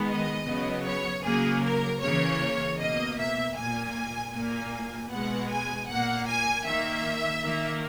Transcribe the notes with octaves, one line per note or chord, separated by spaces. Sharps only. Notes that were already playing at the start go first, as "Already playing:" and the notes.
Already playing: D#3 G#3 B3
D#5
C#3 F#3 B3
C#5
C#3 F#3 A#3 G#4
A#4
C#3 E3 A#3 C#5
B2 A#3 D#5
E5
A#2 A#3 G#5
A#2 A#3 G#5
B2 G#3 B3 F#5
G#5
A#2 A#3 F#5
G#5
D#3 A#3 E5
D#3 A#3